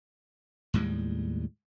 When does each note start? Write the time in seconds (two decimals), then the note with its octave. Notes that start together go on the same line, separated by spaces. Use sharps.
0.74 D#2 A2 G3 G#3